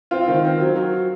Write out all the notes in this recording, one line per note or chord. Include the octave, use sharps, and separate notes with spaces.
C4 F4
D#3
C4
F#3
F#3